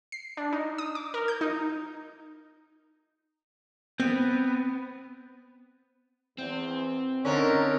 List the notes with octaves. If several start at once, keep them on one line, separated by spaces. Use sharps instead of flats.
C7
D4
D#4
D#6
D6
A#4
G6
D#4
B3 C4
E2 C4
D3 C#4 D#4 A#4